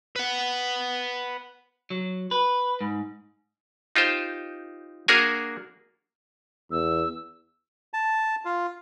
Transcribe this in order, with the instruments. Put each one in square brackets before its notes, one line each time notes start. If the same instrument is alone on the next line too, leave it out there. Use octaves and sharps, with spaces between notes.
[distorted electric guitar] B4 F#5
[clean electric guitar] F#3
B4
G#2
[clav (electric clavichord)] D#4 F4 G4 C5
A#3 D4 F#4 G#4 A#4 G#5
[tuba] E2 [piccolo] E6
[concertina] A5
F4